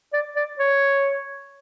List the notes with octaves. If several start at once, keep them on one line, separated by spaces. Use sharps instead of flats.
D5
D5
C#5